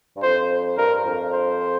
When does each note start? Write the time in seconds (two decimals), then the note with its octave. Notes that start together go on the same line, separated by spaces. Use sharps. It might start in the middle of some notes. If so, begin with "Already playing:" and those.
0.16 G2
0.23 F2 C5
0.77 G2 A#4
1.05 F2
1.32 C5